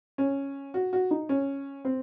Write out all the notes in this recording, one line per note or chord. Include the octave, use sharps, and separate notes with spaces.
C#4
F#4
F#4
D#4
C#4
C4